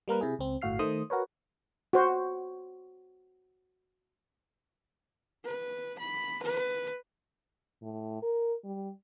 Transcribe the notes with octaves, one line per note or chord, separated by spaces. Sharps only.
G3 A#3 A#4 B4
C3 E4 G#4
C#2 C4
G1 A2 F#4 F5 F6 C7
D#3 A3 C5 D#6
F#4 A#4 B4 C#5
F#4 C5
B4
B5
B4
A2
A#4
G3